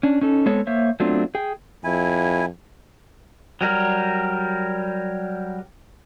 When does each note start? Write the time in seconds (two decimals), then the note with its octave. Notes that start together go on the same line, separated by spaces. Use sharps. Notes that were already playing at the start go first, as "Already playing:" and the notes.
0.03 C#4 D4
0.21 C#4 D#4 A4
0.46 G#3 B3 C4 A4 C#5
0.67 A#3 C5 C#5 E5
1.00 F#3 A3 B3 C4 D4 F4
1.35 G#4 G5
1.84 F2 E4 G#5
3.61 F#3 G3 A#4